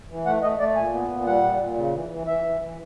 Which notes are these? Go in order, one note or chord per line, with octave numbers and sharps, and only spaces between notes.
E3
A3 F#5
A3 D#5
A3 D5
A#2 G#5
B3
A#2
G3 F#5
A#2
A#2
C#3
E3
E3
E3 E5
E3
E3